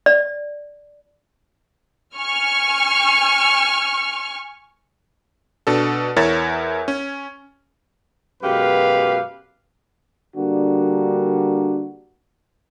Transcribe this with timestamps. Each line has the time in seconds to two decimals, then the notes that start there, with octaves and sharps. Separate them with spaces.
0.06 D5
2.17 G#5 C#6 F6
5.67 B2 D4 A4
6.16 E2 E4 A#4 C#5 E5 A6
6.88 C#4
8.43 F#2 B2 G#3 G4 B4 F5
10.36 D3 G3 A#3 D4 F#4